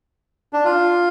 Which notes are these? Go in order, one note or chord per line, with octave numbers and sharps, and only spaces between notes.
D4
F4